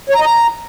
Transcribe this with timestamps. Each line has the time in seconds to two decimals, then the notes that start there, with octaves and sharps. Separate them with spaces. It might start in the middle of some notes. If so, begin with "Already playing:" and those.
0.10 C#5
0.15 A#5
0.20 D#5
0.26 A#5